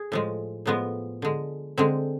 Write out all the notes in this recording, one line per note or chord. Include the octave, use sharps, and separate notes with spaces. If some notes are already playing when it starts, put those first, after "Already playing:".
Already playing: G#4
A2 F3 G#3
A2 F3 G#3 B3
D3 G#3
D3 G#3 C4